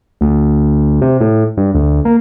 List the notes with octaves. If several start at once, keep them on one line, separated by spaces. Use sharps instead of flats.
D2
C3
A2
G2
D2
A#3